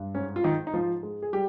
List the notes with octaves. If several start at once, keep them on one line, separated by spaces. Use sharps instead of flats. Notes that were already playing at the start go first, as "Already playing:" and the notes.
Already playing: G2
G#2 C#4
F4
G#2 D#3 D#4
D#4
G#2 F3 F4
G#3
G#4
G3 G4